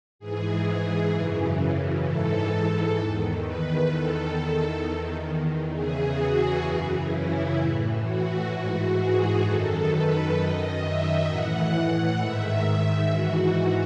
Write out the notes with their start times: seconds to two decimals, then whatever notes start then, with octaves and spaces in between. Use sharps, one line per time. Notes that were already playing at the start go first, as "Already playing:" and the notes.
0.19 G#2 E3 G#4
1.12 F#2 C#3 E3
2.04 G#2 E3 A4
2.50 A4
2.96 E2 D#3
3.42 B4
3.88 E2 D#3 A4
4.80 E2 D#3
5.72 E2 C#3 E3 G#4
6.19 F#4
6.65 F#2 C#3 E3
7.11 E4
7.57 A2 E3
8.03 F#4
8.49 G#2 E3 F#4
8.95 G#4
9.41 F#2 D#3 A4
9.87 B4
10.34 F#2 D#3 D#5
10.80 E5
11.26 A2 E3 F#5
12.17 G#2 D#3 E5
13.10 G#2 E3 F#4